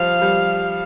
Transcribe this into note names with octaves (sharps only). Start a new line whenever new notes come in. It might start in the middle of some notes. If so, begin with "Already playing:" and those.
Already playing: F3 G3 F5
G3